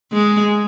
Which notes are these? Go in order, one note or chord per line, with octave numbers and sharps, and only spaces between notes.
G#3